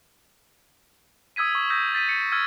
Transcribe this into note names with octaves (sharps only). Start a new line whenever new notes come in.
D#6 E6 G#6 B6 D#7
C#6 D#6
D#6 E6 G6 A#6 B6
A6 B6 D#7
C#7
E6 F6 G#6 D#7